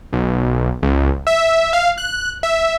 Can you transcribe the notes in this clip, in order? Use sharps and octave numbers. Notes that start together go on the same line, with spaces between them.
B1
C#2
E5
F5
F#6
E5